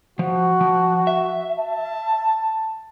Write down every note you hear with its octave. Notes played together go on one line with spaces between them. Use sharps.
F3 F#4
F3
E5
A5